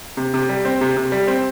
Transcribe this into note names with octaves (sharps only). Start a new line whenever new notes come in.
C3
C3
G3
C4
C3
C3
G3
C4